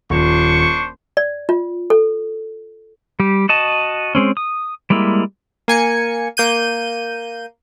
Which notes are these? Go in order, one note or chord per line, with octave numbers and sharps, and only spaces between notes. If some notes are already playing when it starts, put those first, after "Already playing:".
D#1 D4 C5 C#6
D5
F4
A4
G3 G4
F#4 D#5 A5
G#3 C4 C#4
D#6
G3 G#3 A#3 E4
A#3 G#5 C#7
A#3 G6 D#7